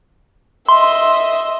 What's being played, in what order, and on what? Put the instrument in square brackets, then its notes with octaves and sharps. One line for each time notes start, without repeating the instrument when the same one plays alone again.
[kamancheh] D#5 E5 [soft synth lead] C6